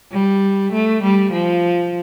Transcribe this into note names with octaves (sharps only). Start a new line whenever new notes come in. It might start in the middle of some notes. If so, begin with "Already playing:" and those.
G3
A3
G3
F3